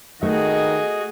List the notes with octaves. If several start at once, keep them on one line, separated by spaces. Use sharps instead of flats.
D#3 A3 F#4 G#4 D#5